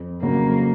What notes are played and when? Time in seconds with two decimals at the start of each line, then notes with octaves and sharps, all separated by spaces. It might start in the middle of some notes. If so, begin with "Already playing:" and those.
Already playing: F2
0.22 C#3 F#3 A#3